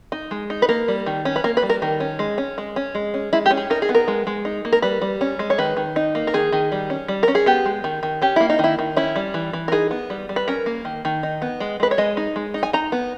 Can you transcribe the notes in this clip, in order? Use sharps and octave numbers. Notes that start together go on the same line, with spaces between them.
D#4
G#3
D#4
B4
A#3 A#4
G3
D#3
C#4
B4
A#3 A#4
B4
G3
A#4
D#3 A#4
C#4
G#3
C#4
G#3
C#4
G#3
C#4
G#3 E4
G4
C#4
G#4
D#4 A#4
G#4
B3
A#4
G#3
G#3
D#4
A#3
A#4
G3 B4
G3
C#4
G#3
C#5
D#3 B4
D#3
D#4
A#3
A#4
D#3 G#4
D#3
G3
C#4
G3
C#4 A#4
G#4
B3 G4
G#3
D#3
D#3
C#4 G4
A#3 E4
D#4
D#3 E4
D#3
C#4 E4
G3
E3
E3
A#4
D#4 G#4
B3
G3
G3
B4
C#4 A#4
A#3
D#3
D#3
D#4
B3
G#3
G#3 B4
C#5
G#3 D#5
D#4
G#3
D#4
G#5
D#4 A#5
B3